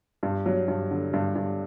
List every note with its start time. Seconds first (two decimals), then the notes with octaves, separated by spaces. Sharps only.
0.23 G2
0.46 F#3
0.68 G2
0.91 D3
1.13 G2
1.35 G2